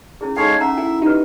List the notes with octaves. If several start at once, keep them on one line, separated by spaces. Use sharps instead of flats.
C#4 E4 G#4
G#3 D#4 A4 C#5 F5 G5
C#4 E5 F#5 A#5
E4 G5
D#4 G4 B4